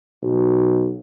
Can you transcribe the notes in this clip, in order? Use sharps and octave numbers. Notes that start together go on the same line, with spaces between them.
B1